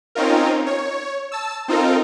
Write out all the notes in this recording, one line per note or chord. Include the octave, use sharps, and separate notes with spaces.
C4 C#4 D#4 F4 A#4
C#5
A5 E6
C4 D#4 F4 A4 A#4